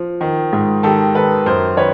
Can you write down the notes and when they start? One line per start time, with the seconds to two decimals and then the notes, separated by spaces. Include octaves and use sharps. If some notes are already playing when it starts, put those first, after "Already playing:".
Already playing: F3
0.21 D#3
0.53 G#2
0.83 D#3 G4 A4
1.15 D#3 A4 B4
1.46 F#2 A#4 C5
1.77 D#3 B4 C#5